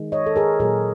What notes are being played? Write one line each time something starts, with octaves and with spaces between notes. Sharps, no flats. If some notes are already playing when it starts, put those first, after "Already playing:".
Already playing: D#3 G#3
C#5 D#5
A4
G#4 A#4
A#2 F#3 A#3 G#4 A#4